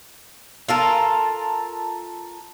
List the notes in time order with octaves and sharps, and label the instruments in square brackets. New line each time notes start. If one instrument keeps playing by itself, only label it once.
[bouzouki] F4 A4 A#4